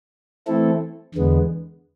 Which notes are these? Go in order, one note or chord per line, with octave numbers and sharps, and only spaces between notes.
E3 A3 C4 E4 A4
E2 D3 G#3 B3